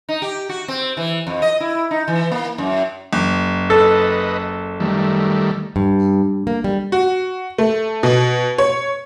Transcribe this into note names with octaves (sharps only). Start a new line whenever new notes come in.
D#4
G4
F#4
C4
E3
F2
D#5
E4
D#4
E3
A#3
F#2
F#1
A4 B4 D#5
D#3 G3 A3
G2
A#3
G3
F#4
A3
B2
C#5